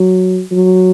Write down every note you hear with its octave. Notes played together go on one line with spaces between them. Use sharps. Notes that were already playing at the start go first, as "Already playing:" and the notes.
Already playing: F#3
F#3